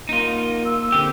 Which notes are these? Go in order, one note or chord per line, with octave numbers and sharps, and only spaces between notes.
A#3 D#4 F4
E6
D3 C4 G4